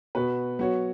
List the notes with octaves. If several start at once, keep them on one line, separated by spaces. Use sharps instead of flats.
B2 B3 F#4 B4
F#3 B3 F#4 C#5